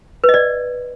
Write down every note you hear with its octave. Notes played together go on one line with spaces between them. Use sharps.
B4
D#5
D5